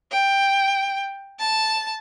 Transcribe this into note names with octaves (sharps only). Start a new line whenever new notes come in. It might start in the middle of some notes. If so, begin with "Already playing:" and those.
G5
A5